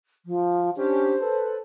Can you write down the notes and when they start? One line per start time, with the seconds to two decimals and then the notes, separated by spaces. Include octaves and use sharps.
0.25 F3
0.77 C#4 D4 G4 C5
1.19 A4 B4